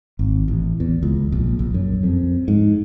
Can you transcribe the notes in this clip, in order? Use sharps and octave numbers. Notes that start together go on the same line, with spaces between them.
G#1
A1
E2
C#2
A#1
A#1
F#2
F2
G#2